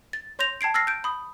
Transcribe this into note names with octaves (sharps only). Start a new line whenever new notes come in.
A6
C#5 C6 G6 A#6 F7
G5 A5 G#6 C7 D7
E6 F6 A6 A#6 C7
G6 D7
B5 D#6